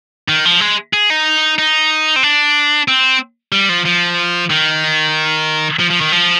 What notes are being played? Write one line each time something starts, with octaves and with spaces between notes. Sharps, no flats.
D#3
F3
G#3
G#4
D#4
D#4
C4
D4
C4
G3
F3
F3
D#3
F3
F3
D#3
F3